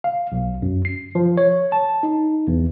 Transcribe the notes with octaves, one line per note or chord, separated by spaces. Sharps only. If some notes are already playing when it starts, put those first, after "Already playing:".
F5
B1
F#2
C7
F3
C#5
A5
D#4
E2